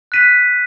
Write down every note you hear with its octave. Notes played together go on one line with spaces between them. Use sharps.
F#6 B6 D#7